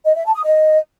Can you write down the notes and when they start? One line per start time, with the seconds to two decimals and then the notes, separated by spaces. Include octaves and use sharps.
0.06 D#5
0.15 E5
0.25 A5
0.34 D#6
0.44 D#5